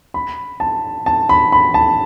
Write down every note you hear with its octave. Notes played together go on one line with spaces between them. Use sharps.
B5
A5
A5
B5
B5
A5